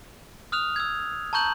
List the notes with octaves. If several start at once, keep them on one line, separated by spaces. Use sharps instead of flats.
D#6 F6 F#6 F7
E6 G#6
A5 A#5 C#6 G6 F#7